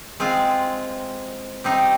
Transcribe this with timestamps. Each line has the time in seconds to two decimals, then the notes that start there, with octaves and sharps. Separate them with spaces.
0.20 G#3 C4 F4
1.64 G3 C4 D#4